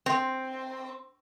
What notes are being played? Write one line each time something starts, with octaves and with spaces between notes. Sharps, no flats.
C4